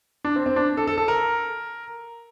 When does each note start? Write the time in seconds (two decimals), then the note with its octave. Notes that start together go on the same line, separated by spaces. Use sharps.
0.25 D4
0.36 C4
0.46 C4
0.56 D4
0.77 A4
0.87 A4
0.98 A4
1.08 A#4